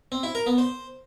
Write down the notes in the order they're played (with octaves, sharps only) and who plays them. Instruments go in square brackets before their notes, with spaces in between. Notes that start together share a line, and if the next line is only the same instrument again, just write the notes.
[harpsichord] C4
E4
A#4
B3
C5